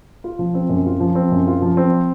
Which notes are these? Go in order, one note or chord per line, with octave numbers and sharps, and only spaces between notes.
F4
F3
C4
F#2
F4
F3
C4
F#2
F4
F3
C4